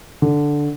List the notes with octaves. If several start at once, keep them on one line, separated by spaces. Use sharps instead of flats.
D3